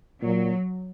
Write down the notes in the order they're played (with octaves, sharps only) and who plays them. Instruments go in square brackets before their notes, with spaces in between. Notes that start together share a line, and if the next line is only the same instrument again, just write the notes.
[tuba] A#2 [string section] F#3